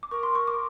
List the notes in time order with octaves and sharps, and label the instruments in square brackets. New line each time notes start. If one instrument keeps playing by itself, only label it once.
[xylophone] D6
[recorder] A#4 [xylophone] C#6
[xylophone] C6
C#6
D6